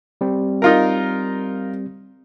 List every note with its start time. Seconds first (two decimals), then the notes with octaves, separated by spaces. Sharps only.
0.21 G3 C4
0.62 D#4 F4 A#4